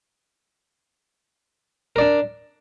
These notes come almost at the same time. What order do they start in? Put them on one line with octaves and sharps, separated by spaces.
A#4 D5 D4